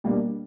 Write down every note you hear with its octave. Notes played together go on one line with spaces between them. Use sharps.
B2 G3 A#3 D4